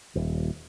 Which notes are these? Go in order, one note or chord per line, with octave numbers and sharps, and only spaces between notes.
D#1